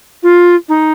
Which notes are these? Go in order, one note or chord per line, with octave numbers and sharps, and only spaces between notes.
F4
D#4